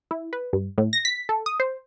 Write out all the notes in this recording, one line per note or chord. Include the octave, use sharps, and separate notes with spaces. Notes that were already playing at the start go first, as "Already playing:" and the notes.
E4
B4
G2
A2
A#6
B6
A4
D#6
C5